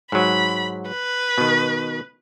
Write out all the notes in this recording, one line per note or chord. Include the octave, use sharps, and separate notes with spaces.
G#2 F#3 B5
B4
B2 D#3